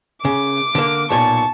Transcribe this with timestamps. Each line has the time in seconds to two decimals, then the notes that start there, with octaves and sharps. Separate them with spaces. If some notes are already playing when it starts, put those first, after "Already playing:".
0.25 C#3 D6
0.75 D3 A#3
1.10 B1 A#2 A5 C#6